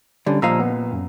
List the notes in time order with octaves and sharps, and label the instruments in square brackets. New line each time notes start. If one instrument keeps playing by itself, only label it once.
[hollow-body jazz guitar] D3 [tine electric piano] G3 C#4
[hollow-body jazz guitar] A#2 D#5 F5 [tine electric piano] F3 A#5 E6
[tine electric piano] B3
F#2